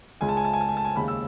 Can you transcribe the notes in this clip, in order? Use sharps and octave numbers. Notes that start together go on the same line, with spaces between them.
C#2 C#3 G#3 G#5
A5
G#5
A5
G#5
A5
G#5
A5
G#5
D#2 C#3 G#3 B5
E6